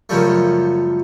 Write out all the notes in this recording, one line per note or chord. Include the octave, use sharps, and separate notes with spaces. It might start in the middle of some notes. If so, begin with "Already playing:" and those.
F#2 C#3 F3 G3 A3